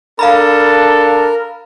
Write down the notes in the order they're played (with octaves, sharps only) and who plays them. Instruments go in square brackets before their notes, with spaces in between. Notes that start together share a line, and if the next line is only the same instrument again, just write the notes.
[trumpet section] D4 A4 [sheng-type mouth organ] A#4 [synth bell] F5 A#5 B5